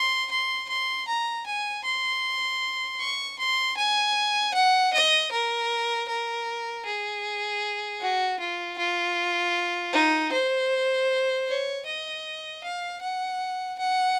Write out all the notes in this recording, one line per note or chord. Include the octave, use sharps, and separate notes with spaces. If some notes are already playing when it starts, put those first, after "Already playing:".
Already playing: C6
C6
C6
A#5
G#5
C6
C#6
C6
G#5
F#5
D#5
A#4
A#4
G#4
F#4
F4
F4
D#4
C5
C#5
D#5
F5
F#5
F#5